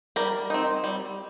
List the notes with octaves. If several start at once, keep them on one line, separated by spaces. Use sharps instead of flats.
G3 A#4
C4 D#4
G3